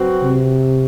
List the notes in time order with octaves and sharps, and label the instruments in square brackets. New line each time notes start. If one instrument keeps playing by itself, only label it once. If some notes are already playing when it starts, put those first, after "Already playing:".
Already playing: [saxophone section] F#3 C4 F#4 B4
[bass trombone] C3